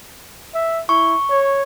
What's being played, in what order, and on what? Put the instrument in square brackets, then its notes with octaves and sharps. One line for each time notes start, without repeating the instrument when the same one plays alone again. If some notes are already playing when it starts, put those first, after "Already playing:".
[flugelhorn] E5
[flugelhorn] E4 [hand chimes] C#6
[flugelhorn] C#5